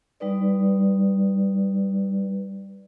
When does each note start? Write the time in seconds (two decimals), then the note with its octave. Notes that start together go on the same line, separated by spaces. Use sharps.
0.20 G3 D#4 B4 D5